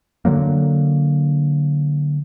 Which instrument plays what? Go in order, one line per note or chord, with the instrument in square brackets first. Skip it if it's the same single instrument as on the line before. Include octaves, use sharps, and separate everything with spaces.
[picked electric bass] D3 F3 F#3 A#3